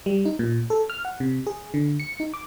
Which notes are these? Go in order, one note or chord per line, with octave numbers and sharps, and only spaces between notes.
G3
D#4
A#2
A4
F6
F#5
C3
G#4
D3
C#7
D#4
D6